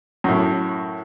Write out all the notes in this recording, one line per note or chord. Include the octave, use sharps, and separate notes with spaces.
F#2 A2